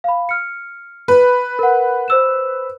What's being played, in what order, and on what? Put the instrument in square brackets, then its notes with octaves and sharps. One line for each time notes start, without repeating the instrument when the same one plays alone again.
[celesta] F5 B5
F6 C#7
[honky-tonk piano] B4
[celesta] A#4 F#5
C5 E6 E7